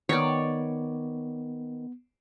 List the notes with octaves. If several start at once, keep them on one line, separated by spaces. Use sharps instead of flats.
D#3 B3 C#5 D5